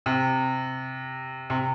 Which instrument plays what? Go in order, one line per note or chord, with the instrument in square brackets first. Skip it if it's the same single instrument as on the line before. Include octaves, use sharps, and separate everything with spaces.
[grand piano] C3
C3